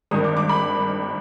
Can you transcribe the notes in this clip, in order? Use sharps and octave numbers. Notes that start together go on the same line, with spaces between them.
G#1 G2 D#3 D#6
D6
D6
B5